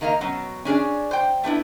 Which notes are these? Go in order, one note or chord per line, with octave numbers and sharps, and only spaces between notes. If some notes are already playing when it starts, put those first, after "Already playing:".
D#3 A#3 D#4 F4 F5
B2 F#3 C#4
C#4 D4 G#4 D5
C5 G5
A3 B3 D4 E4